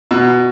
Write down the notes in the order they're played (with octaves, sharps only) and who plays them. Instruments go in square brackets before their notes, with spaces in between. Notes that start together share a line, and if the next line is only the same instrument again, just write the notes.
[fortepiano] B2